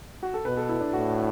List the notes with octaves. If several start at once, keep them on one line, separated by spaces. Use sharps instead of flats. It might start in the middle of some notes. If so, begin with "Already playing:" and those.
F#4
A4
B2 B4
A4
E4
D4
A2 F#4